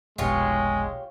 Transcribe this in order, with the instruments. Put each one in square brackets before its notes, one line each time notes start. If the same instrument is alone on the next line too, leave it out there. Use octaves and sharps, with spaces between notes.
[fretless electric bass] F1 B1 B2 [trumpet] G#3 [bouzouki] F4 G4 C#5